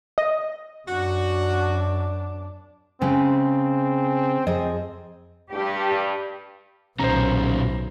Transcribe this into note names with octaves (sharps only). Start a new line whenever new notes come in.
D#5
F#2 D4 F#4
C#3 G#3 C4
F2 C4 G#4 D#5
G2 G4
B1 A#2 D#3 C#4 C5 A#5